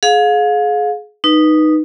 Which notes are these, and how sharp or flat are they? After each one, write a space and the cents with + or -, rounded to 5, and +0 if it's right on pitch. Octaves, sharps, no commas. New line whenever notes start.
G#4 +25 F5 +30
D#4 -10 B4 -10